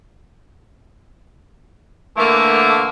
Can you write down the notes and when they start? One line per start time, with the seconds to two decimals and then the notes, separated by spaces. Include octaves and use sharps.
2.17 D3 E3 A3 A#3